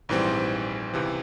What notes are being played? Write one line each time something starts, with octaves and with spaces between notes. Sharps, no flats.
A#1 G#2 E3 G3 C4
C#2 C3 E3